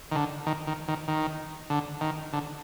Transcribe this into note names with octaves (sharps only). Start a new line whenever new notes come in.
D#3
D3
D#3
D#3
D#3
D#3
D3
D#3
D3